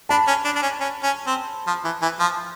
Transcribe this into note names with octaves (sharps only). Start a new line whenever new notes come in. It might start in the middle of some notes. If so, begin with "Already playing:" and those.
D4 A5 B5
C#4
D4
D4
C#4
C#4
C#4
C4
F3
E3
E3
F3